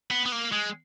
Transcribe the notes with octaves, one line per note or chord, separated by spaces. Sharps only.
B3
B3
A#3
G#3